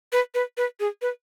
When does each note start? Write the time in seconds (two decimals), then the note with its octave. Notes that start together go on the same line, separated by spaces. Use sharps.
0.13 B4
0.35 B4
0.57 B4
0.80 G#4
1.02 B4